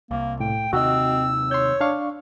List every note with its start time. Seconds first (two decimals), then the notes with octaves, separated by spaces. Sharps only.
0.11 C2 A#3
0.40 A2 G5
0.73 D#2 C3 D#3 C4 F#4 D#5 E6
1.51 C#5 C6 G6
1.81 D4 F5 C#6